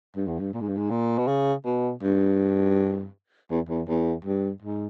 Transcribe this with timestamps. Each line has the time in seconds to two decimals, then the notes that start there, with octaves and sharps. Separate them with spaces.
0.17 G2
0.27 E2
0.40 G2
0.54 A#2
0.61 G#2
0.69 G2
0.77 G#2
0.91 A#2
1.18 B2
1.28 C#3
1.65 B2
2.03 G2
3.51 E2
3.69 E2
3.88 E2
4.25 G2
4.62 G#2